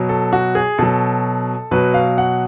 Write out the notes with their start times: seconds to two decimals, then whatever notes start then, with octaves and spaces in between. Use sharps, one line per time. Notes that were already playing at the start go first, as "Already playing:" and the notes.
Already playing: B2 F#3
0.09 A4
0.33 F#4
0.55 G#4
0.78 B2 F#3 A4
1.71 B2 F#3 B4
1.94 F5
2.18 F#5